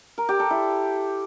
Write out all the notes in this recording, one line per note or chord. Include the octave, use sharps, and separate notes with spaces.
A#4
G4
A4
E4